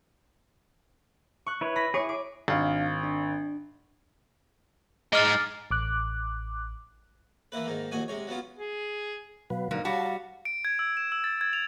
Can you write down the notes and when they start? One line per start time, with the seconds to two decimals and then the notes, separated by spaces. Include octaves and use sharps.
1.46 C#6 F#6
1.61 E4 B4 C#5
1.76 B5 A#6 B6
1.94 E4 G#4 C#5 C#6 D6
2.09 D6
2.48 G#1 D4 F5
3.04 D4
5.13 G#3 D#4 D6 F6 A6
5.71 A1 D6 F#6
7.52 E3 A#3 E4 B4
7.66 G#2 D#3 A#3
7.91 A#1 D#2 F#4 G#5 D#6
8.08 C3 G#3 C#5
8.27 F#3 B3 C#4 F4
8.57 G#4
9.50 B2 F#3 B4 F5
9.71 G#2 D3 F#3 A#3
9.85 G3 F#4 C#5 F5 A5
10.45 D7
10.65 G#6
10.79 E6
10.97 E7
11.12 E6
11.24 A6
11.41 G#6
11.53 F7